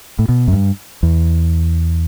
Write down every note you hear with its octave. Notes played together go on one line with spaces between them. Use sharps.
A2
B2
F#2
G2
E2